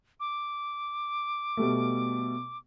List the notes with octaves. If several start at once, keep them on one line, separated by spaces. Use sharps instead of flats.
D6
B2 G3 A3